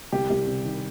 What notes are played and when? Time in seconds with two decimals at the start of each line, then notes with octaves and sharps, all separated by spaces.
0.12 C2 G4
0.30 C2
0.47 C3
0.65 D#3